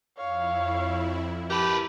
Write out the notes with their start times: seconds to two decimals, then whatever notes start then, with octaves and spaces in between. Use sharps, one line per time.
0.17 F2 E4 C#5 F5
1.50 G4 A#4 B4 A5